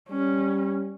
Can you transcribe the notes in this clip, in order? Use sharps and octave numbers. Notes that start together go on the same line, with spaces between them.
G3 C#4